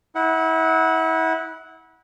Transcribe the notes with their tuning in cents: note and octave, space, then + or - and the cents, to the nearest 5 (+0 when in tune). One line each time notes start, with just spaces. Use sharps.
E4 -30 F#5 +0